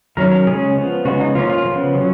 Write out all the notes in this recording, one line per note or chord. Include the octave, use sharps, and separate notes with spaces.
D#3 F#3 C#4 A#4
A#4
C#3 G#3 C#4 G#4
F3 B3
C#3 G#3 B3 F#4
D#4
F3 A#3 C#4 F4
F4
C#3 F3 B3
F#3 C#4